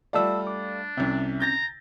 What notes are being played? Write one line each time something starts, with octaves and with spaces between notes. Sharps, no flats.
G3 A3 F4 D5 A5 E6
D4 D6
C2 C3 C4 C#4
A#5 G6 A6 A#6